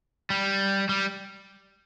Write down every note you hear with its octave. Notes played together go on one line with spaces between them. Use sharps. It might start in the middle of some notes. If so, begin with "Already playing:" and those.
G3
G3